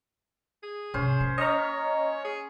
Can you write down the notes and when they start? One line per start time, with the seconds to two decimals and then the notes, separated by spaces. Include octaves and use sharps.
0.63 G#4
0.94 G#2 C3 C#4 C5
1.20 A#3
1.38 C#4 C#5 D#5 A#5
2.25 G#4